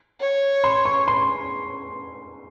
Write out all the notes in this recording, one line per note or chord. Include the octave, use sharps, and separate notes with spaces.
C#5
C6
C#6
C6